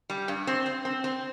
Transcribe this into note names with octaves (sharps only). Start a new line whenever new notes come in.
G3
G2
C4
C4
C4
C4